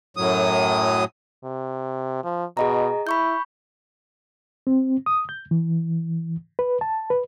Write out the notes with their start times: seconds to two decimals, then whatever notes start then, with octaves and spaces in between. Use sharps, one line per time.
0.17 F#2 A2 F#3 D#6
1.44 C3
2.24 F3
2.57 B2 G#4 D#5 A#5
3.07 E4 B5 C#6 G6
4.67 C4
5.06 D#6
5.29 G6
5.51 E3
6.59 B4
6.81 A5
7.10 B4